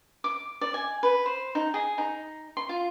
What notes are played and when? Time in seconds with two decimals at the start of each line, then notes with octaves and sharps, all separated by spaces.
0.24 D6
0.61 D5
0.74 G#5
1.03 B4
1.26 C5
1.55 D#4
1.74 G#4
1.98 D#4
2.57 C6
2.69 F4